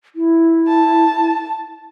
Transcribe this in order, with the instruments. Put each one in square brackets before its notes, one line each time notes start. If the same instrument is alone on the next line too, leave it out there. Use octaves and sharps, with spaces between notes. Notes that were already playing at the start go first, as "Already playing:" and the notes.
[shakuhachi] E4
[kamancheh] A5